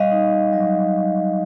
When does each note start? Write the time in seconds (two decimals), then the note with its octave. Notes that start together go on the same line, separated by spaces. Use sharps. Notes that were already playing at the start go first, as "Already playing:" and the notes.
Already playing: G3 D#5 F5
0.11 D#4
0.53 F#3